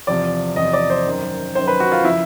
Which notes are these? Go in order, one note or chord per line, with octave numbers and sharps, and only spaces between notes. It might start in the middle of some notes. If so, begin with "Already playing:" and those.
E2 C3 F3 D5
E2 C3 F3 D#5
D5
C5
F#2 D#3
F#2 D#3 C5
B4
F#4
F4
C#3 F3 E4